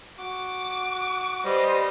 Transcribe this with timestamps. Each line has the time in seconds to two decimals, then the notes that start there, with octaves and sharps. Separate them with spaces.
0.19 F#4 D6
1.45 G3 B4 C5 D#5